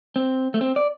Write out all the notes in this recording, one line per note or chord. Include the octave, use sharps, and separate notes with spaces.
C4
A3
C4
D5